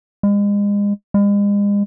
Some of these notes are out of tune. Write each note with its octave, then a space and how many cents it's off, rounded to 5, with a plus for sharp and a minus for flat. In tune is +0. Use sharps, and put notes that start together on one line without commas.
G#3 -35
G#3 -40